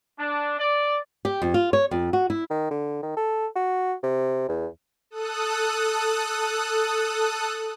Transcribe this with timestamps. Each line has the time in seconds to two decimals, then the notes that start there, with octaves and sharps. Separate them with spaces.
0.19 D4
0.59 D5
1.25 G4
1.42 F2
1.54 F4
1.73 C#5
1.91 F2
2.13 F#4
2.30 E4
2.50 D#3
2.71 D3
3.02 D#3
3.17 A4
3.56 F#4
4.03 C3
4.48 E2
5.10 A4 D#6 F#6